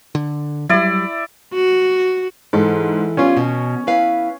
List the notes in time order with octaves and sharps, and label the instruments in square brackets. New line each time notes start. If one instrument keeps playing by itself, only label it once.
[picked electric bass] D3
[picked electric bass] F#3 G3 [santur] E4 D5
[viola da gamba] F#4
[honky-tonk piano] G#2 [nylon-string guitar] E3 A4
[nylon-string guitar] G3 B3 F4 [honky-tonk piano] C#4
[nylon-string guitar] B2
E4 B4 F5